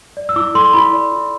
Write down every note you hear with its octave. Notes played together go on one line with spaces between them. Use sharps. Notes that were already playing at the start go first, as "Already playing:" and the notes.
D5
E6
E4 D6
A4 C6
E4 B5
D5
E4